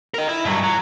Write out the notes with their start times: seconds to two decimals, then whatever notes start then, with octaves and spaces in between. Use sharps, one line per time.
0.14 A#4 D#5
0.29 E4
0.45 G2 F#3
0.64 F#3